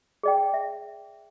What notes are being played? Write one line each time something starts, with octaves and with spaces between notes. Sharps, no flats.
G#4 D5 G5
E5